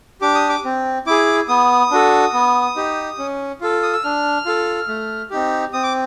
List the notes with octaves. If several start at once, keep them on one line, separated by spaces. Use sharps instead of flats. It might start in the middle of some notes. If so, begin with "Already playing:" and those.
D4 G4 D6
D#6
D6
C4
E4 G#4 D6
B3 D#6
D4 F#4 A4
B3
D#4 G4
C#4
F4 A4
D#6
E6
D4 F6
F4 A4
A3
C4 D#4 G4
C4 D#6
D6